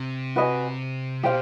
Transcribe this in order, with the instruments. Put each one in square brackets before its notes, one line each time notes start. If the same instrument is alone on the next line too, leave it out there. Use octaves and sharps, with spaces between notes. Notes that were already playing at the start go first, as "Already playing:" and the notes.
Already playing: [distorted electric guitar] C3
[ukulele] F#4 B4 D#5 G#5
[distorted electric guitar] B2 [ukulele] G4 C5 F5